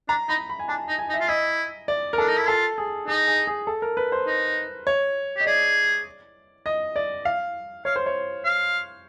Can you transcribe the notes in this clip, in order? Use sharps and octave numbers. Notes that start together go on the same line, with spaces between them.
D4 A#5
D#4 B5
B5
G#5
D4 A5
D#4
G#5
D#4
E5
F4
E4 D#5
D5
A#4
D4 A4
D#4
E4
F4 A4
G#4
D#4 G#4
G#4
G#4
A4
A#4
B4
C5
D#4
C#5
G4 D#5
G#4 D5
D#5
D5
F5
C#5 F5
C5
C#5
F5